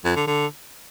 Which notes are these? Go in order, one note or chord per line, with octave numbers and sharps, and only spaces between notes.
F2
D3
D3